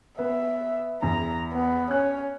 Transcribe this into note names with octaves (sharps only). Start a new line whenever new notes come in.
B3 E5
E2 A#5
B3
C#4 F#6